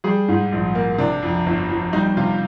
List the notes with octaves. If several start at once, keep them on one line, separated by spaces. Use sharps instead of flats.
G3 G#4
G#2
A#1
A#3
C3 D4
F2
G1
F3
G3 D#4
C3 F4